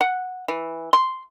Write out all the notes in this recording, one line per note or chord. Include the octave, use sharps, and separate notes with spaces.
F#5
E3
C6